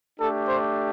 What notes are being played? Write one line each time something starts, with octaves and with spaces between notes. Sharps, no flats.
A3 D4 G4 A4
C5